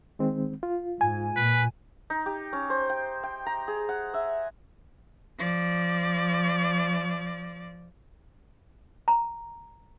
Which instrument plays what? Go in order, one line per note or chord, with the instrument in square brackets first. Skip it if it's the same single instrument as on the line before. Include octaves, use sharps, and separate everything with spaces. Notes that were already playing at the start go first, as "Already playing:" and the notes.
[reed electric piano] D#3 G#3 C4
F4
[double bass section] G#2 [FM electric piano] G#5
[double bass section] A#2 [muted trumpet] B4
[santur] D#4
G4
C#4
C5
G5
G5
A#5
G#4
F#5
E5
[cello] F3 D5
[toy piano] A#5